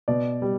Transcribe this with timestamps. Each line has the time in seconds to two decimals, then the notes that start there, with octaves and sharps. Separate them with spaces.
0.08 B2 D5
0.42 G3